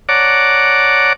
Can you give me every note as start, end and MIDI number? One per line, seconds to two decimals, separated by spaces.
0.09 1.13 73
0.09 1.13 74
0.09 1.13 78
0.09 1.13 81
0.09 1.13 82
0.09 1.13 86